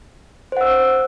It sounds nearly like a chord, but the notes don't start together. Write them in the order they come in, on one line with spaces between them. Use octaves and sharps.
C5 F#5 E6